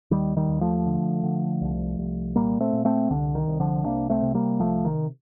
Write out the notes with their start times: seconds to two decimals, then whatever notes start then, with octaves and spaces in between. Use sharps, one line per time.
0.11 D#2 D#3 G3
0.37 D#3 G3
0.48 D#2
0.61 F3 A3
0.86 D3
1.23 D3
1.61 C2
1.99 C2
2.36 A#2 G3 A#3
2.60 A3 C4
2.73 A#2
2.85 A3 C4
3.10 C2 D3
3.35 D#3
3.48 C2
3.60 D3 F3
3.85 C3 A#3 D4
4.10 A3 C4
4.22 C3
4.34 G3 A#3
4.59 C2 F3 A3
4.85 D#3